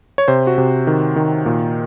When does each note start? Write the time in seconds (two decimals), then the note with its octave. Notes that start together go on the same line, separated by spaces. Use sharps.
0.18 C#5
0.28 C3 C5
0.47 F#4
0.58 C3
0.87 D#3
1.16 D#3
1.46 A#2